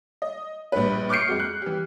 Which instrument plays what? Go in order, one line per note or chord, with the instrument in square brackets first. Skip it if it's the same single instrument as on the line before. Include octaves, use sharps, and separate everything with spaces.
[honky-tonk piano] D#5
A#1 G2 B4
C#6 D6 F6 G6 C7 C#7
F2 G#3 F#4
F#6
E3 G4